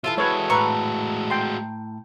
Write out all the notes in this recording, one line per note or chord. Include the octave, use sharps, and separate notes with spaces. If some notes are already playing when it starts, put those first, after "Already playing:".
E3 F4 A4 E5
G#3 F#4 B4 C#5
A2 B4 A#5 C#6
G5 C6